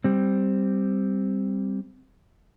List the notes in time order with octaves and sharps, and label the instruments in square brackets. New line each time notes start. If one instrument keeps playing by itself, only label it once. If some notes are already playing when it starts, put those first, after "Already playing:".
[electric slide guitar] G3 C4